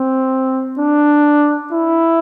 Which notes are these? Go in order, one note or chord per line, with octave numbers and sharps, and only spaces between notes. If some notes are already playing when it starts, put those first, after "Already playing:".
Already playing: C4
D4
E4